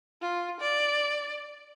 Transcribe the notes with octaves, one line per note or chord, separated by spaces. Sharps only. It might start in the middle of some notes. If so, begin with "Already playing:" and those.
F4
D5